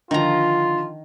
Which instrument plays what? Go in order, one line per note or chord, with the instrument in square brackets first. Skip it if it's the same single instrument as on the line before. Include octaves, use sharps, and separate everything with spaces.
[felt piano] D3 F3 [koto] D#3 A#5 [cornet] F4